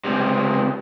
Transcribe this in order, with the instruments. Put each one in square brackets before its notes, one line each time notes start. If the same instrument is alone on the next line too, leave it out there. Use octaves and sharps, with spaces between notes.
[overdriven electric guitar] C#2 C3